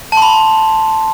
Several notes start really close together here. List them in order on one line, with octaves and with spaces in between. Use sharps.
A5 C6 B5